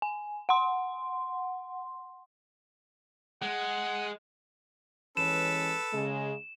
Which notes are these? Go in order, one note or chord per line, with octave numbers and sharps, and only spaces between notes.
G#5
F#5 C6
G#3 F#5
E3 G#3 C#4 A4 B4 E7
C#3 G#3